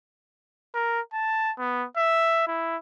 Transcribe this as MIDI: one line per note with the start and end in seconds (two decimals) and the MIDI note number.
0.74 1.01 70
1.13 1.52 81
1.59 1.85 59
1.97 2.46 76
2.48 2.77 64